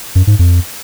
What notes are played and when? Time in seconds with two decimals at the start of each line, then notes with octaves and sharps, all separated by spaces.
0.15 F#2
0.27 G#2
0.39 F2